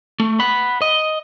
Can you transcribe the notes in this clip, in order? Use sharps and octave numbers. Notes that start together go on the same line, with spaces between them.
A3
F#5 B5
D#5